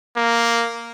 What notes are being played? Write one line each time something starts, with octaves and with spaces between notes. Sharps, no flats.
A#3